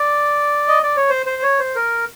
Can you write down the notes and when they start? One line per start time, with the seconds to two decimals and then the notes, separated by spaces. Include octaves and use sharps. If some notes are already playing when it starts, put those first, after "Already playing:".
Already playing: D5
0.68 D#5
0.83 D5
0.96 C#5
1.10 C5
1.26 C5
1.43 C#5
1.59 C5
1.75 A#4